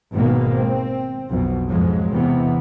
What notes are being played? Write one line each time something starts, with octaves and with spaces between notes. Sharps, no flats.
G#1 B2 D#3 G#3 A#3 B3
C4
B1 F2 B2
F2 G#2 F3 F#3 G#3
E2 C3 E3 B3